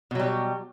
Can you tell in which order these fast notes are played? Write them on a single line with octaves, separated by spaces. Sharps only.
B2 F#3 G3